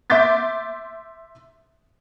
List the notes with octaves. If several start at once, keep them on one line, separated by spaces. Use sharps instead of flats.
E5 C6 D6 G6 A6 B6